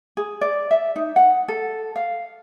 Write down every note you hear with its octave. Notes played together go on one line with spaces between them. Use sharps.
G#4
D5
E5
D#4
F#5
A4
F5